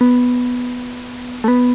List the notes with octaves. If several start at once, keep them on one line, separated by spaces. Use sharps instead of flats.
B3
A3
B3